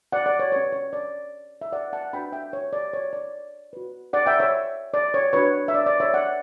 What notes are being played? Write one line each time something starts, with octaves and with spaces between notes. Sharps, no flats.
D5 F#5
D5
C#5
C#4 G4 B4 C#5
C#5
D5
E5
D5 F#5
F#5 A5
D4 F#4 B4 G5 B5
E5 G5
C#5
D5
C#5
D5
F#4 B4
D5 F#5
E5 G5
C#5 E5
D5
C#5
D4 F#4 B4 C#5
E5
D5
D5
C#5 E5
D5 F#5